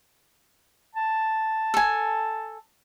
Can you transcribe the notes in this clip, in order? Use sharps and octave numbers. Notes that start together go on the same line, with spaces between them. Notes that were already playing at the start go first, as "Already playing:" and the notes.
A5
A4 G#5